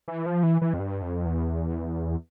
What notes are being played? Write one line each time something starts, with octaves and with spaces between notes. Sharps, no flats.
E3
F3
E3
E3
F2
G2
F2
E2